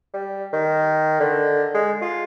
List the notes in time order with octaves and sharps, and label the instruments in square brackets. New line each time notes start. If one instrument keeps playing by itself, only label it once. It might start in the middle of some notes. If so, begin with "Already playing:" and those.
[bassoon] G3
D#3
D3
G#3
F4